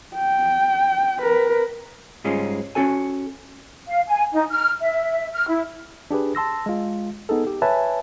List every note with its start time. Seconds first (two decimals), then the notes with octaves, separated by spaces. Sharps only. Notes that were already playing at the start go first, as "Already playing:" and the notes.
0.15 G5
1.21 A#4 B4
2.24 G#2 G3 G#3 C#4 F4
2.75 C#4 F#4 A4 G#5
3.88 F5
4.08 G#5
4.33 D#4
4.50 F6
4.81 E5
5.34 F6
5.48 E4
6.11 D4 G4 G#4 B4
6.35 A5 C6 E6 A#6
6.66 G#3 F4
7.29 B3 D#4 G#4 A4
7.47 G4
7.62 B4 C#5 E5 G#5 A5